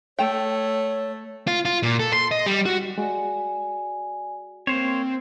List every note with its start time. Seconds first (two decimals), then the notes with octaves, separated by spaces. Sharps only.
0.19 A3 C#5 G5
1.47 F4
1.65 F4
1.83 A#2
2.00 A4
2.13 C6
2.31 D#5
2.46 G3
2.66 F#4
2.98 G#3 F#4 D5 G#5
4.67 A#3 C4 C5 C#5